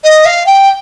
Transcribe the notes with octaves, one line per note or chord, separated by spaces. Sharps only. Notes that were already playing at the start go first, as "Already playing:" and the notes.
D#5
F5
G5